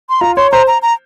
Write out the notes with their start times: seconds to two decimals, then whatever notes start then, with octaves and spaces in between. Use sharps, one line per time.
0.09 C6
0.21 F4 A#5
0.36 C#5 C6
0.52 C5 A#5
0.67 A#5
0.82 A#5